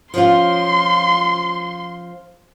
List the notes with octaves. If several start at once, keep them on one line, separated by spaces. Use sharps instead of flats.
F3 C#4 F4 C6